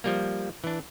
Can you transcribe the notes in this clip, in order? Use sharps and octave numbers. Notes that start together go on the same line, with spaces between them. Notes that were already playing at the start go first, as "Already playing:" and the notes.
F3 G3 A#3
E3 D4